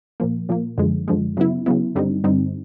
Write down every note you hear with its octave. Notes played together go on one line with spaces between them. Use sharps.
A#2 F3 A#3
A#2 F3 A#3
F#2 D3 F3 G#3
F#2 D3 F3 G#3
C#3 F#3 B3 E4
C#3 F#3 B3 E4
G2 D3 G3 C4 D#4
G2 D3 G3 C4 D#4